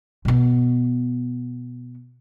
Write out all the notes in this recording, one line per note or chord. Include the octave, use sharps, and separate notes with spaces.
B2 B3